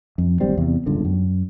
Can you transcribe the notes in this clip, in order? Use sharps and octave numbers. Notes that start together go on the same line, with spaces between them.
F2
G#1 D2 G3 C4
E2 C3
D1 G1 C#2 D3
F#2